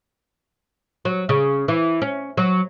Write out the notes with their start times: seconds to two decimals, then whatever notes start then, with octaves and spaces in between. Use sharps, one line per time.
1.05 F#3
1.29 C#3
1.68 E3
2.02 C#4
2.37 F#3